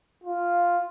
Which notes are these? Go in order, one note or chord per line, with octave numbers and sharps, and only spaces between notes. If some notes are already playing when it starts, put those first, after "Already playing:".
F4